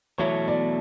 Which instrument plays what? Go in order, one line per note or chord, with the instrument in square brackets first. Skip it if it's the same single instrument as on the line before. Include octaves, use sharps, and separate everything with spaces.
[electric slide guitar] E2 B2 F#3 A3 E4 [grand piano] C#5
[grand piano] D5